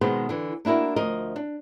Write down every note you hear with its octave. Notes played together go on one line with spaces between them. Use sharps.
B2 D#3 G#3 B3 C4 C5
D3 E3
A#3 D4 E4 F#4 A#4
D2 F3 A#4 D#5
D4